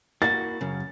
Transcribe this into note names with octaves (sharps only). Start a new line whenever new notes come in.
A#3 E4 F#4 A6
F#2 C#3